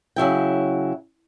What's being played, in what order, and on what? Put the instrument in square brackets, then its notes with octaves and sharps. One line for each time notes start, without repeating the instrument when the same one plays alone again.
[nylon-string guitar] C#3 F#3 E4 G5